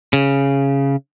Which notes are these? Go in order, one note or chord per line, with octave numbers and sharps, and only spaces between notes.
C#3